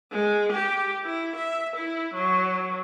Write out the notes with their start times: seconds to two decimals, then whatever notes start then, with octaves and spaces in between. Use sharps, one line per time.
0.12 G#3
0.52 G4
1.04 E4
1.36 E5
1.76 E4
2.14 F#3